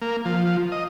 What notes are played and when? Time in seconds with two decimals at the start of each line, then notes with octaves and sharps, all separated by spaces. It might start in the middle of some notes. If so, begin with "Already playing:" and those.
0.02 A#3
0.25 F3
0.72 D#5